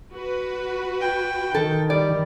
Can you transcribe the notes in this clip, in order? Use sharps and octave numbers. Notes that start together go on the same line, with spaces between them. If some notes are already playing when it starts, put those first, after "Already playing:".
F#4 B4
G5
D#3 A4
G3 D5